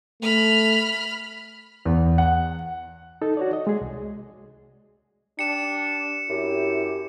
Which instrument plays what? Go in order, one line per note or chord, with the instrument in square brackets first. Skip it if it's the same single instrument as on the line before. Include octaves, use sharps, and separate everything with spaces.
[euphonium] A3 [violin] B5 F6
[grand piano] E2
F#5
[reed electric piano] D#4 A4
F#4 C#5 D5
D#5
G#3 G#4
C2
[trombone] D4 [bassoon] G4 [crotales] C#7 E7
[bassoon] F#2 [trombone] E4 [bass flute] G4